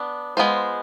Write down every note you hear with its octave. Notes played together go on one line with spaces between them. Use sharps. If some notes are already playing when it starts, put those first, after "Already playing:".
Already playing: B3 D4
G#3 B3 F4 C5